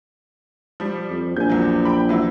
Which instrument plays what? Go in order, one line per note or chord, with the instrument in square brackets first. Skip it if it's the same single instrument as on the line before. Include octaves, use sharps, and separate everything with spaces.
[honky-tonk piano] F3 G3
[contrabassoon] F2
[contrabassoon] A#1 [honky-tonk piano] G#5 G6
[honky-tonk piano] E2 F#3
G5 B5
E3 F#3 E4